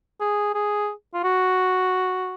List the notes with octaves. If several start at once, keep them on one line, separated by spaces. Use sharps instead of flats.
G#4
G#4
F4
F#4